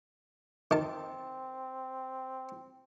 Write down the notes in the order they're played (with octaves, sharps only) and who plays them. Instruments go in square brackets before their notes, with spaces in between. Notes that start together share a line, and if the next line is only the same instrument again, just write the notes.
[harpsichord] D#3 A5 [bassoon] C4